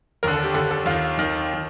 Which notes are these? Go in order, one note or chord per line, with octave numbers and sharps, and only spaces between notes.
D#2 D3 A#4
A4
G4
D#2 D3 A4
A4
D#2 D#3 F4
D#2 D#3
D#3